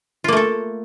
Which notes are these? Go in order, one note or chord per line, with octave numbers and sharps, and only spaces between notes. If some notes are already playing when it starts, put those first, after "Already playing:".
A3 A#3 F4 A4